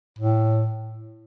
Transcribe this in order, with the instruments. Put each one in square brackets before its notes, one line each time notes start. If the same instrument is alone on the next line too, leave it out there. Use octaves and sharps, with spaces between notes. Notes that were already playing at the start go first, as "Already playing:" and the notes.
[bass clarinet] A2